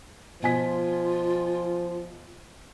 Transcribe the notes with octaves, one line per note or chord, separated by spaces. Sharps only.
B2 F3 F4 G#5 B6